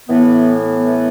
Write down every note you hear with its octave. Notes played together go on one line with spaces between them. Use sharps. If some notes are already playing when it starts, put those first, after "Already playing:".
A2 E3 B3
B3